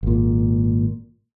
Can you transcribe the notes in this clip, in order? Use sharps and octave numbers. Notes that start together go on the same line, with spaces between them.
G#1 A#2